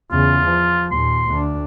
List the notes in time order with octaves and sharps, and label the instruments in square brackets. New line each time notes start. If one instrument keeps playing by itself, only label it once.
[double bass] E2 C#3 [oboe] F4
[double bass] F3
[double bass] D#2 A#2 [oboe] C6
[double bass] D2 D4